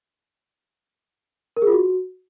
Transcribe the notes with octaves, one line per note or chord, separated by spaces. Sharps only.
A#4
G#4
F4
F#4